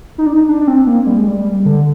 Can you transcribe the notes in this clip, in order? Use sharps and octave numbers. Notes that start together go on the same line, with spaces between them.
D#4
D4
D#4
D4
D4
C4
A#3
G3
G#3
G3
D3